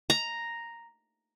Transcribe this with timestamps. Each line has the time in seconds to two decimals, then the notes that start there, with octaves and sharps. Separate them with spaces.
0.10 A#5